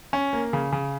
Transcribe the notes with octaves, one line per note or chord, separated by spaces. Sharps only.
C#4
A#3
C#3
C#3